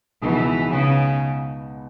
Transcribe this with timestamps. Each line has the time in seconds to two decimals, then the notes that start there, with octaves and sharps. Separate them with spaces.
0.22 C#2 B2 E3 G#3 B3 D#4
0.70 C#3